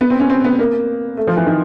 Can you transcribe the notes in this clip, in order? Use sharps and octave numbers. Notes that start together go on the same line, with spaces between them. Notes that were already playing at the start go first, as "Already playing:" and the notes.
B3
C4
C#4
C4
B3
A#3
A3
F3
E3
D#3